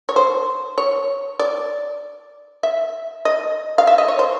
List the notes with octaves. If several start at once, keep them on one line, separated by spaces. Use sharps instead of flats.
C#5
C5
C#5
D5
E5
D#5
F5
E5
D#5
C#5
C5